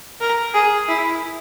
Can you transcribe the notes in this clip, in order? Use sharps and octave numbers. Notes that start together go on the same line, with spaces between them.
A#4
G#4
E4